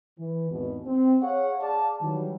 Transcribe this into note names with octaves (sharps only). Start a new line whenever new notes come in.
E3
G#1 E2 B2
C4
G#4 C#5 F5 F#5
G#4 D5 F5 A5
D#3 E3 F#3 G3